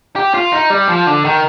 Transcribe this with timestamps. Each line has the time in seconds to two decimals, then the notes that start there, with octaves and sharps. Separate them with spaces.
0.16 G4
0.34 F4
0.53 D#4
0.70 G3
0.89 F3
1.07 D3
1.24 D#3